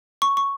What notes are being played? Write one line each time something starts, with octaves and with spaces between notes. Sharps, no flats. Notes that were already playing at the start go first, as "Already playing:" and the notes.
C#6
C#6